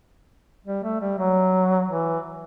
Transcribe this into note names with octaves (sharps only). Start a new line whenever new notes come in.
G3
A3
G3
F#3
E3